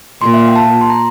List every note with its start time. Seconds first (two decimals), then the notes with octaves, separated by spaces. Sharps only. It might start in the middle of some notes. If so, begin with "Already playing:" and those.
0.21 A#2 C6
0.34 E5
0.41 F5
0.48 G5
0.56 A5
0.81 C6
0.90 A#5